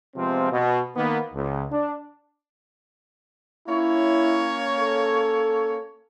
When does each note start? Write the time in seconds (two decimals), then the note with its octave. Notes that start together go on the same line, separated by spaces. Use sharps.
0.15 C3 F3 G#3 B3 C4 F4
0.52 B2
0.96 D#3 A#3 B3
1.33 C#2
1.71 D4
3.68 A#3 C#4 E4 C#5
4.79 A4